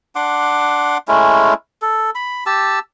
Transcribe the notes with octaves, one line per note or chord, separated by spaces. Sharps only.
D4 F#5 C6 D6
G#3 A3 C#4 E4
A4
B5
G4 A5 E6